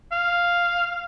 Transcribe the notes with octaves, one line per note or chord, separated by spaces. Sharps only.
F5